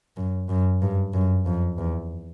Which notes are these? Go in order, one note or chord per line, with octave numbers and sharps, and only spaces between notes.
F#2
F#2
G2
F#2
F2
E2